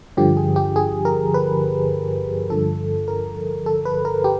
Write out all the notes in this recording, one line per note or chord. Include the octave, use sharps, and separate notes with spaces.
G2 D3 F3 G4
G#4
G4
G#4
A#4
B4
G2 D3 F3 A4
A#4
A4
B4
A#4
G4